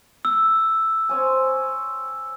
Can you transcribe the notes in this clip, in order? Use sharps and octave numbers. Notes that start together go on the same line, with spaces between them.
E6
C4 C#5 G#5